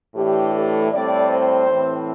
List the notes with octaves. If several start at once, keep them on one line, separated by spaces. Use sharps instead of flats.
A2 E3 A3 D4 G4
A4
A2 G3 C4 D5
C5
A2 E3 C4